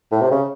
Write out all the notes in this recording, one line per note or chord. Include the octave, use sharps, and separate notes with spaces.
A2
C3
C#3